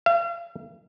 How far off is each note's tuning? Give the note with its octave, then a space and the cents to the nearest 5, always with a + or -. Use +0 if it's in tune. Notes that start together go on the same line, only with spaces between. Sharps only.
F5 -40